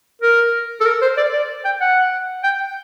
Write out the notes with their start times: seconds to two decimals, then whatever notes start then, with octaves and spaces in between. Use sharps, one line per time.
0.22 A#4
0.81 A4
0.86 A#4
1.02 C5
1.17 D5
1.33 D5
1.65 G5
1.81 F#5
2.44 G5